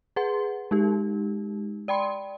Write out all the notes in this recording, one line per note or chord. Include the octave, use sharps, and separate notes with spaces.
G#4 B4 F#5 C6
G#3 D#4 G4
D5 G5 B5 C6